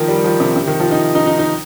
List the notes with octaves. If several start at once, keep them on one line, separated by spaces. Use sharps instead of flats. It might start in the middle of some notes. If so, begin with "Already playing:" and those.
Already playing: D#3 F3 A#3
G3
F3
C3
C3
D#3
F3
D#4
D#4
D#4
D#4